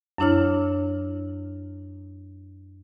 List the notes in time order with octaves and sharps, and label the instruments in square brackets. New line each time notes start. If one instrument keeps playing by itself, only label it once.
[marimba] F#2 F#3 D4 E4 C#5 F6